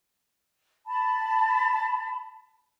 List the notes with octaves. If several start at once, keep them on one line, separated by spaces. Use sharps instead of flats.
A5 B5